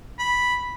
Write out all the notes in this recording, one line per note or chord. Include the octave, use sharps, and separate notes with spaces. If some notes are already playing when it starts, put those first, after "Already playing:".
B5